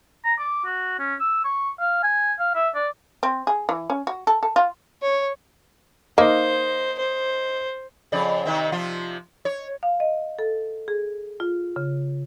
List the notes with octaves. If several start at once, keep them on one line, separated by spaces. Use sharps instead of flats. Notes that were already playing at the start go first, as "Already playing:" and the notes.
A#5
D6
F#4
C#4
E6
C#6
F5
G#5
F5
E5
D5
C4
G#4
E3
C#4
F#4
A4
A4
F4
C#5
A#3 D#4 C5
C5
F2 C#3 D5
C3 D#3 C4
C3 F3 F4
C#5
F5
D#5
A4
G#4
F4
C#3